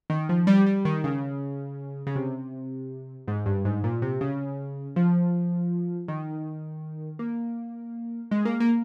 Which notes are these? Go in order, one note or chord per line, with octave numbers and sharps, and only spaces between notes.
D#3
F3
G3
G3
D#3
C#3
C#3
C3
G#2
G2
G#2
A#2
C3
C#3
F3
D#3
A#3
G#3
A#3
A#3